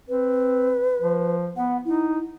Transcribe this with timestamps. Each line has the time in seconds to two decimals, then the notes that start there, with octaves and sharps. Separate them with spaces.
0.09 C4 B4
1.01 F3
1.56 B3 F#5
1.85 D#4 E4